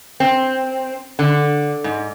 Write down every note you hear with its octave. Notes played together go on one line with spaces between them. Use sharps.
C4
D3
G#2